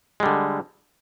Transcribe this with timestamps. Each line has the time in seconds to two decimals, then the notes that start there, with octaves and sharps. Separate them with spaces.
0.20 G#3
0.23 G3
0.26 D3